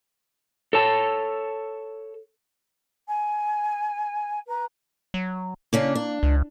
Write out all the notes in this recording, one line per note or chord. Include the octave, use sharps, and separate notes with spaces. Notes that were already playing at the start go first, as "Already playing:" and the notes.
A4 C#5 A5
G#5
B4 A#5
F#3
C#3 A#3 C#4 D4
D4
C#2